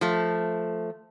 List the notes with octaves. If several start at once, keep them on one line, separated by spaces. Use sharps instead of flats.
F3 A3